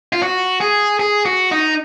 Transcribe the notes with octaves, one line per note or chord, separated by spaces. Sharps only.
F4
F#4
G#4
G#4
F#4
D#4